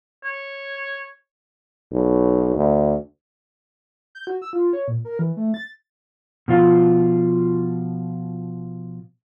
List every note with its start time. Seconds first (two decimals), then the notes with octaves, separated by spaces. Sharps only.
0.24 C#5
1.92 B1
2.55 D2
4.15 G6
4.27 F#4
4.42 E6
4.53 F4
4.73 C#5
4.88 A#2
5.05 A#4
5.19 E3
5.37 A3
5.54 A6
6.48 B2 F3 F4